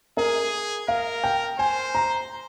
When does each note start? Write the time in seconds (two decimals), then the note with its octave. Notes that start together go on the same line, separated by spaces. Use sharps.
0.17 G#4 A#4
0.88 A#4 F5
1.24 G5
1.58 C5 G#5
1.95 A#5